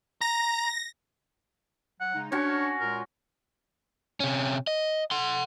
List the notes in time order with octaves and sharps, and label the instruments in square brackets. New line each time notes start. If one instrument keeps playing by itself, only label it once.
[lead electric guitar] A#5 [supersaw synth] A#6
[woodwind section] F#3 [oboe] F#5
[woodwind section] C#3 G#3 D#4
[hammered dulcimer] C#4 F#4 [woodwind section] D4 [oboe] C#5
[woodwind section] A#2 G#3 F4 [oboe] A#4
[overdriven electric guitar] C3 C#4
D#5
F#5 C6